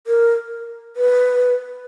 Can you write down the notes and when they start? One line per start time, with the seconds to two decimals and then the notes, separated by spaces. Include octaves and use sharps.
0.07 A#4
0.96 B4